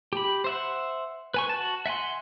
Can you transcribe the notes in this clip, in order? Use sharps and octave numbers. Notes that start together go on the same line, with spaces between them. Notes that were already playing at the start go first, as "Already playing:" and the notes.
G4 B5
C5 E5 F#5
B4 G#5 C#6
F#4 A5
E5 F#5 G#5 C6